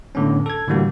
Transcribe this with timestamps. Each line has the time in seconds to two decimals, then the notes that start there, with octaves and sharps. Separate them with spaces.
0.15 A2 D3 B3 C#4
0.46 A4 G#6
0.67 A2 D3 E3 G3 A#3 F#4